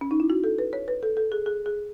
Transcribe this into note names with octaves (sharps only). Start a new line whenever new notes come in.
C#4
D#4
E4
F#4
A4
B4
C#5
B4
A4
A4
G#4
G#4
G#4